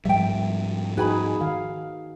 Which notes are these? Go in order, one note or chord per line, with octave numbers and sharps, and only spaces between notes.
G#2 F3 G3 E5 G5
D#4 F#4 G#4 B4 G#5 B5
D#3 F5